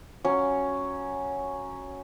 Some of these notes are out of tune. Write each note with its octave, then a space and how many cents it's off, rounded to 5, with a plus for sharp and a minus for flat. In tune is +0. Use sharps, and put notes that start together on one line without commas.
F#3 +0 C#4 +0